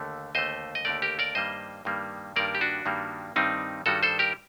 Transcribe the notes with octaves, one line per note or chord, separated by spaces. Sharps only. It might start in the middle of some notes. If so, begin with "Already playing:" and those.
Already playing: D#2 D3 A3
D#2 D3 A3 C5 D#5
D#5
D#2 D3 A3 A#4 D5
G4 A#4
A#4 D5
G2 D#3 G3 A#3 C5 D#5
G2 D#3 G3 A#3
G2 D#3 G3 A#3 A#4 D5
G4
D4 F#4
G2 D#3 G3 A#3
G2 D#3 G3 C4 D#4
G2 D#3 G3 F#4 A4
A4 C5
G4 A#4